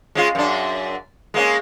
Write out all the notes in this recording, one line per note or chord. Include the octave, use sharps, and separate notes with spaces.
G#3 C#4 F4
F#2 D4
G#3 A#3 C#4